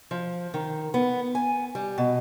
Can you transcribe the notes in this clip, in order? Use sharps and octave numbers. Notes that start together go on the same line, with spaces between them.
F3
D#3
B3
G#5
G3
B2